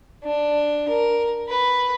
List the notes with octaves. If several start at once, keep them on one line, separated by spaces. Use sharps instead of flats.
D4
A#4
B4